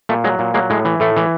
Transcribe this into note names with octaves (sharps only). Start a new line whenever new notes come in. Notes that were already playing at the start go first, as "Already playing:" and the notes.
A#2 A3
F#3 G#3
A#2
F#3 G#3 A#3
A2 G#3
E3
A2 A3
E3